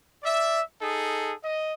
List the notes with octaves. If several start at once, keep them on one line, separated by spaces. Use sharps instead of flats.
D5 E5
D#4 G#4 A4
D#5